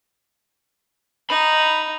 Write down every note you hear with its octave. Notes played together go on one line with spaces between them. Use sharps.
D#4 B5